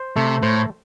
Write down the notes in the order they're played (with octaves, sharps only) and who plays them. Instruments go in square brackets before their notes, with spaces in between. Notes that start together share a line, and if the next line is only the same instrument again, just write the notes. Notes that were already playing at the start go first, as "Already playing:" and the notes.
Already playing: [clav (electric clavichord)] C5
[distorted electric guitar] C3 [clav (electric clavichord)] A3
[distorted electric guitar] A2 [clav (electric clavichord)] C5